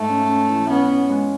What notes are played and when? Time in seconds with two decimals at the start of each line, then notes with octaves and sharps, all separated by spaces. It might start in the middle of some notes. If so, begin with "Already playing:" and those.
Already playing: G#2 A3
0.09 C#4
0.29 C#4
0.49 E3
0.69 B3 C#4
0.90 C#4
1.09 G#3